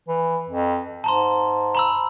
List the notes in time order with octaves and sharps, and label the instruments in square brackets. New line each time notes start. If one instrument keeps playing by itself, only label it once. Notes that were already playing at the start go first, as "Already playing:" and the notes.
[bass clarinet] E3
F2
[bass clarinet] G#2 [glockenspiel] A5 A#5 C6
[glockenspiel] A#5 B5 E6